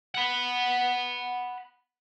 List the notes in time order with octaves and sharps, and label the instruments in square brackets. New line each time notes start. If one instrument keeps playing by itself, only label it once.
[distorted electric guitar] F#5 B5